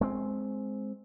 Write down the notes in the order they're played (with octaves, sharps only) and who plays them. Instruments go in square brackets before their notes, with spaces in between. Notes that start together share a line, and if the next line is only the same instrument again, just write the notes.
[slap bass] G#3 C4